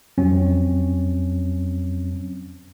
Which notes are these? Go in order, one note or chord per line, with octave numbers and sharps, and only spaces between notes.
F2 F#3 C4 C#4